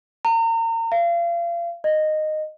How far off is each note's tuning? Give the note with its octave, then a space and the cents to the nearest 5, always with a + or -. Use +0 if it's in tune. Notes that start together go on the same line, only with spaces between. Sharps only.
A#5 -35
F5 -35
D#5 -10